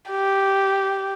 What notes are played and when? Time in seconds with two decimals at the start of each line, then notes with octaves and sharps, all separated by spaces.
0.10 G4